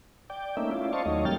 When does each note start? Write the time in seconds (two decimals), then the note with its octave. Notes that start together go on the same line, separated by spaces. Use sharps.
0.30 D5 G5
0.57 A3 A#3 C#4 D#4 E5
0.71 C#4 E4 F4 D5
0.93 C5 D#5 F5 A5 C#6
1.06 D#2 F#3 A3 D#4 C#5 D#5
1.25 G3 A#3 C#4 G5 F6 A6